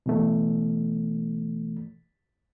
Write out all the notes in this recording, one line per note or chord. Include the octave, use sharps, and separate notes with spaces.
B2 E3 A3